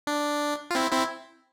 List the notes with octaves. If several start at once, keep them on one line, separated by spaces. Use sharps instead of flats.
D4
F4
C4 E4
C4 E4